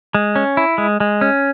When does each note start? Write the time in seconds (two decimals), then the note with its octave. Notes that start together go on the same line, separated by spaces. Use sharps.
0.15 G#3
0.36 C#4
0.57 E4
0.78 G#3
1.00 G#3
1.21 C#4